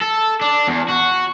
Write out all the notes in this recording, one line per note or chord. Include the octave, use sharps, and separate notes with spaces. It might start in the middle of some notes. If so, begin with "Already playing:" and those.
A4
D4
E2
F#4